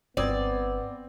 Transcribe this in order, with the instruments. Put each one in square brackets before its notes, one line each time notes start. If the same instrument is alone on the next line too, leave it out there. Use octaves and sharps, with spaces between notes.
[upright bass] G1 [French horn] B3 [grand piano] C4 D#6 G#6 [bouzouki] D5